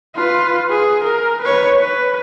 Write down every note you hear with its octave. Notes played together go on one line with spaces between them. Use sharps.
F4 B4
G#4
A#4
B4 C#5
B4